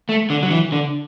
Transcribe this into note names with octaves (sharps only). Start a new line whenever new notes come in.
A3
D3
F#3
E3
D3